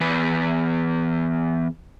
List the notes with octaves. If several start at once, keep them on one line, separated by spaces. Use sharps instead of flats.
E2 B4